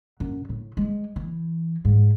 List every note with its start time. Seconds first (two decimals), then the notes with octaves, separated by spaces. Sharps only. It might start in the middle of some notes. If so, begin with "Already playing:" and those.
0.20 F#2
0.49 A2
0.77 G#3
1.16 E3
1.85 G#2